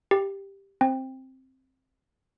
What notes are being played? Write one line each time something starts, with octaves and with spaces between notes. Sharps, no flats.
G4
C4